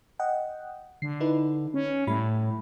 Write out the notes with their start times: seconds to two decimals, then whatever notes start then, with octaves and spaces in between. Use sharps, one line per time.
0.19 D#5 F#5 G5
1.02 D3 C7
1.20 D#4 E4 B4
1.74 C#4
2.07 A2 G3 E4 B5